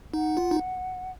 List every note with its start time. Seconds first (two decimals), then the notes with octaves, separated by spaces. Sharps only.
0.14 D#4 F#5
0.37 F4
0.51 D#4